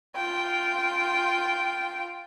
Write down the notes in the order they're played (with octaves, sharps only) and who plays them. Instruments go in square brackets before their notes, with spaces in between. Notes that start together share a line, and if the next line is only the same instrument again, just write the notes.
[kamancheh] F4 G5